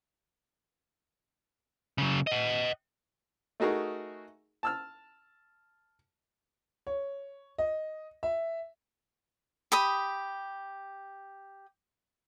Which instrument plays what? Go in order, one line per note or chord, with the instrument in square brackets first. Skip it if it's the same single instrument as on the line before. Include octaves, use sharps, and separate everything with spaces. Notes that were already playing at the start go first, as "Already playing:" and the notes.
[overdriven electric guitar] C#3 F#3
D#5 F#5
[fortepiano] A3 D#4 F#4 G#4 A#4
A5 E6 F6
[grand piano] C#5
D#5
E5
[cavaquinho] G4 B5 D#6